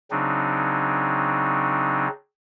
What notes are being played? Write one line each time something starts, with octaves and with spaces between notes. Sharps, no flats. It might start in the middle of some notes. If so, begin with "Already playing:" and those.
C#3 F#3 C4 D4 D#4